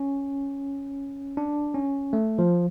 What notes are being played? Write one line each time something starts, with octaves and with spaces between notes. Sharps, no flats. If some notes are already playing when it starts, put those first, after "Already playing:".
Already playing: C#4
D4
C#4
A3
F3